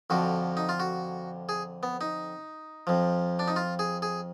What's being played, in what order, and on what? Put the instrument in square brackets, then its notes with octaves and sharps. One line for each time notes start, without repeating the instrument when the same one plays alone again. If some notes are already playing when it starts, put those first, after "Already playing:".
[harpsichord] F2 D3 F3 F#4
D#4
F4
F#4
G#4
B3
D#4
F2 F3
D4
D#4
F4
G#4
G#4